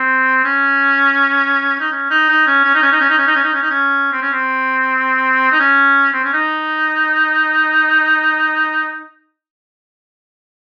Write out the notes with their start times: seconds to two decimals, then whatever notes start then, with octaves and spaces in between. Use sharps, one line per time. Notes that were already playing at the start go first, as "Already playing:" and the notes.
Already playing: C4
0.45 C#4
1.81 D#4
1.92 C#4
2.10 D#4
2.29 D#4
2.47 C#4
2.65 C#4
2.75 D#4
2.83 C#4
2.92 D#4
3.01 C#4
3.09 D#4
3.18 C#4
3.27 D#4
3.35 C#4
3.44 D#4
3.54 C#4
3.62 D#4
3.70 C#4
4.12 C4
4.22 C#4
4.32 C4
5.52 D#4
5.59 C#4
6.13 C4
6.24 C#4
6.33 D#4